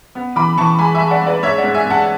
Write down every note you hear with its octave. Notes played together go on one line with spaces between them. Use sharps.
B3
E3 B5 D6
E3 A5 C#6
G#3 G#5 B5
E5 G#5
G#3
D5 F#5
G#3
B4 D5
G#2 C#5 E5
D5 F#5
G#2
E5 G#5
G#2 F#5 A5
F#5